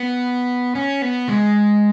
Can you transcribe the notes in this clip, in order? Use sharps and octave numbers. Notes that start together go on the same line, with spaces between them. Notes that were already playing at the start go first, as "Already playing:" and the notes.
Already playing: B3
C#4
B3
G#3